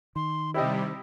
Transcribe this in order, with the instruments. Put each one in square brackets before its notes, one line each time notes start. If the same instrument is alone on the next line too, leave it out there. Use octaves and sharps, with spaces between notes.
[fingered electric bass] D#3 [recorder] C6
[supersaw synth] C3 G3 [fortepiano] E4 G4 D#5 [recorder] C5